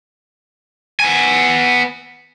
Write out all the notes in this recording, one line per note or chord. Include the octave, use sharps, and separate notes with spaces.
B3 G#5